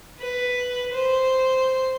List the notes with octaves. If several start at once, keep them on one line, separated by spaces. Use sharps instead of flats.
B4
C5